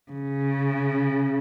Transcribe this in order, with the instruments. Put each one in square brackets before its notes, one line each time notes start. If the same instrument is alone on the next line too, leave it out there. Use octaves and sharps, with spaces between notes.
[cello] C#3